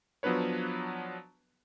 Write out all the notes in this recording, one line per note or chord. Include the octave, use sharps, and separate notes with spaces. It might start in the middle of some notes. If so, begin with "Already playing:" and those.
F3 F#3 B3 D4 B4 C#5